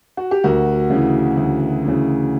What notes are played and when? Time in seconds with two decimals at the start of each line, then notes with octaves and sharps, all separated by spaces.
0.17 F#4
0.31 G4
0.44 D2 F#4 A#4
0.90 C#3 E3
1.37 D2
1.84 C#3 E3